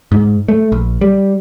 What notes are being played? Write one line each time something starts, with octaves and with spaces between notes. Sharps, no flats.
G#2
A3
A#1
G3